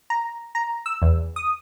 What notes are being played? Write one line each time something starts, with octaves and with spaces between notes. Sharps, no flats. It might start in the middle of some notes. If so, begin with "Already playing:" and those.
A#5
A#5
E6
E2
D#6